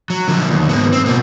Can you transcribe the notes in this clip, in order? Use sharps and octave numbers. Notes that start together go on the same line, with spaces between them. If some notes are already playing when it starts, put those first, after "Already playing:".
F#3
D3 F3
D#2
G#2 B3
C4
B2 A#3